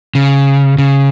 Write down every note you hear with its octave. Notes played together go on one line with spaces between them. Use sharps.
C#3
C#3